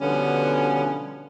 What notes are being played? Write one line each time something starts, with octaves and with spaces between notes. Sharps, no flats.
B2 D3 F3 G3 B3 C#4